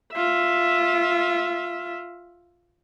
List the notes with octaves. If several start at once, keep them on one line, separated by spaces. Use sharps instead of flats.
F4 E5